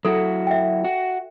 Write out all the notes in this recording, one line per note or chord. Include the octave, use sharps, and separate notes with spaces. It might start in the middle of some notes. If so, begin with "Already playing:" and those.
F#3 E4 F#4 A4
E5 G5
F#4